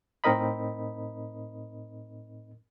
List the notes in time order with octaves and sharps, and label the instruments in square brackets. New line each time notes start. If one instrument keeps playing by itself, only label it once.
[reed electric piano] A2 C4 D#4 A#4 D#5 B5